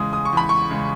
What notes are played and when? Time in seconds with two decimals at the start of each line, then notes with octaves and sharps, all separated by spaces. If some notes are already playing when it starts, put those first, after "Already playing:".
Already playing: E2 C#3 G#3 D#6
0.13 D#6
0.25 C#6
0.33 E2 B5
0.49 C#6
0.70 C#3 G#3